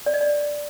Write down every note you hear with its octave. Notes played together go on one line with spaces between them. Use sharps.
D5
D#5
D5